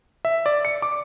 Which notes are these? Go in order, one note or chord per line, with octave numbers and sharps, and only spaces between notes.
E5
D5
C#7
D6